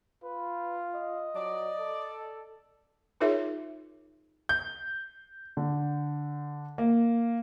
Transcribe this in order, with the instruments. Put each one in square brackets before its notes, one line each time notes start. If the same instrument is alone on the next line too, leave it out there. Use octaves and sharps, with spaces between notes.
[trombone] F4 [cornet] B4
[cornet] D#5
[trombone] F#3 [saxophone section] D5
[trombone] A4
[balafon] D#4 F4 G#4 A#4 C#5 E5
[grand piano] G6
D3
A#3